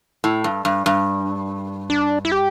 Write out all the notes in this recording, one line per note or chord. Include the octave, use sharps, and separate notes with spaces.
A2
G2
G2
G2
D4
E4
G4